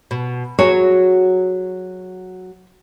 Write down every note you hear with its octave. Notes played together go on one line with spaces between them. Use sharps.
B2
F#3 F#4 G#4 C#5